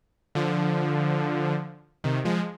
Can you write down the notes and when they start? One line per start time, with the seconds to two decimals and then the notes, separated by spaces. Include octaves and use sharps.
0.35 D3 F3
2.04 C3 D#3
2.25 F3 G#3